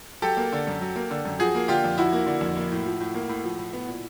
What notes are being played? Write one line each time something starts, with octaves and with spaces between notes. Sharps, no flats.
F#3 G4 A4
A#3
D3
F#2
F#3
A#3
D3
F#2
F3 F#4 G#4
A#3
D3 F4 G4
F2
F3 E4 F#4
A#3
D3
F2
A#3
A2
F3
A2
A#3
A2
F3
A2
B3
A#2